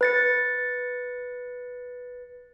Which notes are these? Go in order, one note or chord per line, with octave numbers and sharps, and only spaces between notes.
B4 A6 C#7